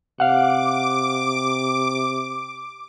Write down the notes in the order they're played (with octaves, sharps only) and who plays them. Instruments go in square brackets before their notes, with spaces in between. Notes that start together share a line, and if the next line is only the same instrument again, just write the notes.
[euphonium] C3 [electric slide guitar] F5 F#5 [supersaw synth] D6